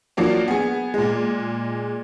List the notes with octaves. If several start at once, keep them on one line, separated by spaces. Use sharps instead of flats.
F3 F#3 A#3 D4
B3 G#4
A#2 G#3